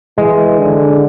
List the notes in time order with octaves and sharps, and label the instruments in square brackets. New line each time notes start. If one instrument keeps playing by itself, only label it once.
[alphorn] E3 [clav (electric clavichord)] G#3
[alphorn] D3